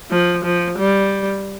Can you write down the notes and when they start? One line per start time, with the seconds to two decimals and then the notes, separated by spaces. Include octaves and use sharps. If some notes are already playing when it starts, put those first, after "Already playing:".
0.10 F3
0.44 F3
0.78 G3